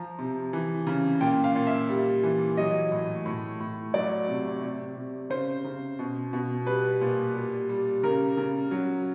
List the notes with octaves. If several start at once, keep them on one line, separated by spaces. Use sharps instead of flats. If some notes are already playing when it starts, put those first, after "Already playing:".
Already playing: F3 A#5
C3
E3
C#3
A#2 G5
F5
A#2
E5
G3
E3
F#3 D#5
A2
A2
A2
F#3 D5
C3
C3
C3
C#3 C5
C#3
B2
B2
G3 B4
A#2
G3
G3
C#3 A#4
C#3
F#3